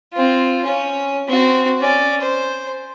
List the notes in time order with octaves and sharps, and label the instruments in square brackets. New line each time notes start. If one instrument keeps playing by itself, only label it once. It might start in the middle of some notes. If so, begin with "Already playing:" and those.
[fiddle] C4 F4
C#4 C#5
C4 F#4
C#4 D5
C5